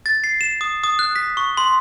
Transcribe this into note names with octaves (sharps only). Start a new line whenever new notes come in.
A6
C7
E7
D#6
D#6
F#6
B6
C#6
C6